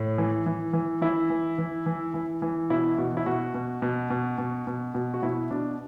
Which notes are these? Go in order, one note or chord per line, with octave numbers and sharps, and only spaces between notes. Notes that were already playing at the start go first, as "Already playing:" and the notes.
Already playing: A2
E3
E3
E3
E3 E4
E3
E3
E3
E3
E3
B2 E4
B2 F#4
E4
B2 F#4
B2
B2
B2
B2
B2
B2
F#4
B2 E4
B2 D4